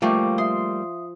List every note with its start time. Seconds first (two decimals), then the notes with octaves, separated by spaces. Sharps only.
0.02 F3 G3 A3 A#3 G5 C#6 D6
0.38 E5 C6 D#6